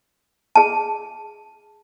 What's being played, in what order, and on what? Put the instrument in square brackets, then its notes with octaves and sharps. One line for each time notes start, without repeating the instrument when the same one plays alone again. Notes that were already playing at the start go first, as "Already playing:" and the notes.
[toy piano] G#4 A5